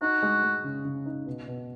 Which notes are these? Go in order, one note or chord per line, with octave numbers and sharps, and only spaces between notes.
D#4 F#4
G#3
G#3
C#3
C#3
D#4
B2
B2